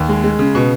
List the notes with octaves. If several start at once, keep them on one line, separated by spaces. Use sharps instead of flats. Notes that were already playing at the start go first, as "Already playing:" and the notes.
Already playing: D#2
G#3
G#3
C#3
B2